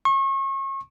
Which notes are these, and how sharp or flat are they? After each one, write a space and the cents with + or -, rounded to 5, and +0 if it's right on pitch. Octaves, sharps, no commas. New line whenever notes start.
C#6 -35